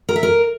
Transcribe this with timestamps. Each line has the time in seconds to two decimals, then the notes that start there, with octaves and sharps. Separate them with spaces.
0.09 A#4
0.16 E5
0.23 A#4